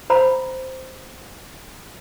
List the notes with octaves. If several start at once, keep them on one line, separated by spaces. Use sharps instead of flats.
C5 A#5 B5